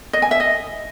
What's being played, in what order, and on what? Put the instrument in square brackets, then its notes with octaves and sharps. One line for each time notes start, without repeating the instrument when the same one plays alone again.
[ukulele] D#5
G#5
E5
D#5